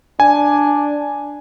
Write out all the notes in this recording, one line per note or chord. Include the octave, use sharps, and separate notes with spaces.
D4 G#5